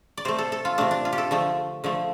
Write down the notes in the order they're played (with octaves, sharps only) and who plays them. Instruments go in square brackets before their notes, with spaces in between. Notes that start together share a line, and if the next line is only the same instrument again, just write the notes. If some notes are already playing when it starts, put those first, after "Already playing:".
[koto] D5
C3 A3 C5
A4
A4
F4
C3 A3 D4
D4
F4
G4
A4
D3 F3 A3
D3 F3 A3